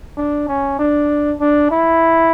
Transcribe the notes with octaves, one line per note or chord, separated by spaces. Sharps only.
D4
C#4
D4
D4
E4